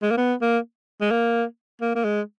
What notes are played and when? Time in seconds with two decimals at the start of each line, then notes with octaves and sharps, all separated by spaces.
0.02 G#3
0.11 A#3
0.17 B3
0.41 A#3
1.01 G#3
1.11 A#3
1.81 A#3
1.95 A#3
2.04 G#3